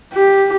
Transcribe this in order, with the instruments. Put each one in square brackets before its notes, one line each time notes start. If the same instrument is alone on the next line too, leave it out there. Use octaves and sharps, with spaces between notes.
[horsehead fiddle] G4